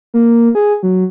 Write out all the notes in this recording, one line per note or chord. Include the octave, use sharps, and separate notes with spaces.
A#3
G#4
F#3